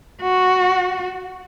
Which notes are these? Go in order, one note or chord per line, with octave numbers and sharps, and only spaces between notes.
F#4